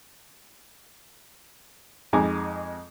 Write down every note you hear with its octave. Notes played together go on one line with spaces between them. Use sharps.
F2 G#3 D#4 G#5 A#5 D6